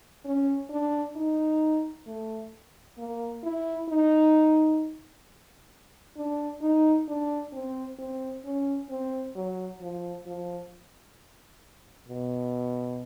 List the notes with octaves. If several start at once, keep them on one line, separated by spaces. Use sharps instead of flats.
C#4
D4
D#4
A3
A#3
E4
D#4
D4
D#4
D4
C4
C4
C#4
C4
F#3
F3
F3
B2